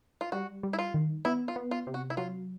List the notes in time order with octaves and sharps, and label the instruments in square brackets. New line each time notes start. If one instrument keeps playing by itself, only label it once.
[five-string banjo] F4
[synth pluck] G3 [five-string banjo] F#4
[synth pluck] G3
[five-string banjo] E4
F4
[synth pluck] D#3
[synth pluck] B3 [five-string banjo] E4
[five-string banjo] F4
[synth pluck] B3
[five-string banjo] F4
[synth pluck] C3
[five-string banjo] F#4
E4
[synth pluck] F#3 [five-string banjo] F4